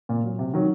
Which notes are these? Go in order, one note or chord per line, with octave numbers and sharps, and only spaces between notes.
A#2
F#3
C3
D#3 F#3